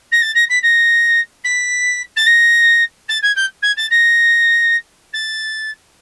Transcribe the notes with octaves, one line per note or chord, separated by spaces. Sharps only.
A#6
A6
A#6
B6
A#6
B6
A6
A#6
A6
G#6
G6
G#6
A6
A#6
A6